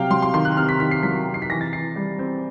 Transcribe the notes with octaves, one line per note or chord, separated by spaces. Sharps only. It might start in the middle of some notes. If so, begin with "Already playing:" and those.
Already playing: C3 F#3 F5 G5
F#3 C6
C6
D#3 C6
F#6
C3 F6
B6
D#3 B6
C7
F#3 B6
C3
C7
B6
E3 A#6
A6
E3 C7
G3
C4